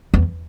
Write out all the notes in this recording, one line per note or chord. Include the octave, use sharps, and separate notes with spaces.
E2